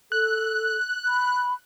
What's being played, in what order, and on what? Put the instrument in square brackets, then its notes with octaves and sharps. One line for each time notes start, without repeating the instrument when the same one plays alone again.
[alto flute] A4 [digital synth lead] F#6
[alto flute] B5